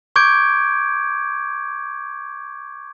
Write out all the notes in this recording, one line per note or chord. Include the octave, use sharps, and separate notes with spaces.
C#6 D6 G6 G#6 D7